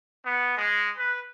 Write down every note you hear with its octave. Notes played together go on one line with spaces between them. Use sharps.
B3
G#3
B4